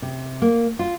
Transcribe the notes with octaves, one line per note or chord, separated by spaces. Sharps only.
C3
A#3
F4